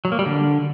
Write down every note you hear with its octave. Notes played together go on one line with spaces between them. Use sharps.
F#3
A#3
G3
D3